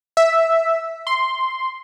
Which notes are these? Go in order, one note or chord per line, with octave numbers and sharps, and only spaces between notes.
E5
C6